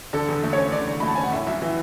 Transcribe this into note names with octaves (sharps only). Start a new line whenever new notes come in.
D3 A4
E2
A3
C#4 C#5
D3 D5
E2
A3 B5
A5
C#4 G#5
F#5
A2 E5
B1 E5
E3 E5